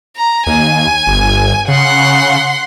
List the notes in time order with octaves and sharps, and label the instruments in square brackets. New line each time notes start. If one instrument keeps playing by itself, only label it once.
[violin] A#5
[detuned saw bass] D#2 [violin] G#5
[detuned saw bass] G1
[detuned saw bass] C#3 [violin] F#5 C6